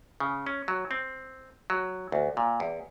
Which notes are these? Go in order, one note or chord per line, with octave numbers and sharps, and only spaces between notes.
C#3
C#4
F#3
C4
F#3
D2
A#2
E2